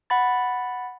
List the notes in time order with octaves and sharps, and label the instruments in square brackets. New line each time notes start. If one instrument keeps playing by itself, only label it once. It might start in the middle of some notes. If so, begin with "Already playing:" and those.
[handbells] F#5 B5 A6